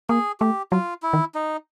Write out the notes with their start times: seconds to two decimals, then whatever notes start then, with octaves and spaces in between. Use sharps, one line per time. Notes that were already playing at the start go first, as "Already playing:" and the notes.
0.09 A#3 G#4
0.40 A3 G4
0.72 F#3 F4
1.03 E4
1.13 D#3
1.35 D#4